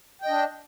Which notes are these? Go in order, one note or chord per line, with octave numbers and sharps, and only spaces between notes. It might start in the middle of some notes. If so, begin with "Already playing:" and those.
D4 D#5 G5